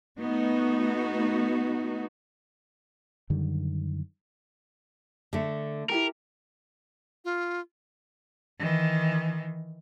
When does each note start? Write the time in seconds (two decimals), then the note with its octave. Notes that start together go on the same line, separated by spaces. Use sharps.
0.18 A3 B3 D#4 F#4
3.30 F#2 D3 D#3 G3
5.33 D3 A3
5.89 E4 G4 A4 A#4
7.25 F4
8.59 D#3 E3